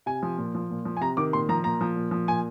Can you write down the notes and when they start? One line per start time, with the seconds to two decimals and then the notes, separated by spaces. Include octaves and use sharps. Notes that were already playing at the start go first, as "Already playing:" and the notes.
0.06 C3 G#5
0.23 F3
0.38 A#2
0.55 F3
0.71 A#2
0.85 F3
0.97 G#5
1.01 C3 A#5
1.17 D#3 D6
1.33 A#2 C6
1.49 F3 A#5
1.64 A#2 A#5
1.81 F3
1.96 A#2
2.11 F3
2.28 A#2 G#5